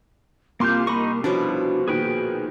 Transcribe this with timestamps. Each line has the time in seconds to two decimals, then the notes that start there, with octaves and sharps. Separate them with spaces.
0.60 C2 A#3 C4 F4 C6 D6 G6
0.87 A#3 D#4 D#5 B5 C#6
1.24 B2 F3 C#4 D4 E4 F#4
1.88 A#2 D#3 G#4 B4 G5